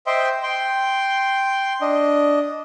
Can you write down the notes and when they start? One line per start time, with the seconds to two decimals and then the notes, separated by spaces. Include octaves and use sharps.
0.07 C5 D#5 E5 G5 C6
0.43 G5 C6
1.81 D4 D#5